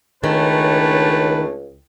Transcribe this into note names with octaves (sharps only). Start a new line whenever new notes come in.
C#2 D#3 A3 C#4 D4 B4